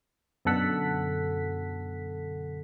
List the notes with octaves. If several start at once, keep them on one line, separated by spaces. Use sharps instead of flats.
F#2 B2 D3 A4 F#5 B6